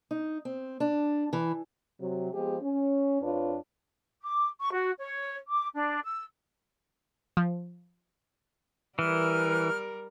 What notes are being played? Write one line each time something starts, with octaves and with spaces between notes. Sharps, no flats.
D#4
C4
D4
E3
C3 F#3
F3 G#3 B3 G4 G#4
C#4
F2 D4 F4 B4 C#5
D6
C#6
F#4
C#5
D6
D4
E6
F3
E3 G3 A#4 F6